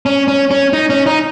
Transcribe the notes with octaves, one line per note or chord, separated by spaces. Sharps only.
C#4
C#4
C#4
D#4
C#4
D#4